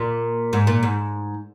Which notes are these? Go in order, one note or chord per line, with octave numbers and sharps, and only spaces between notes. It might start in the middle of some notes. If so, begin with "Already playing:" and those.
Already playing: A#2
G#2
A#2
G#2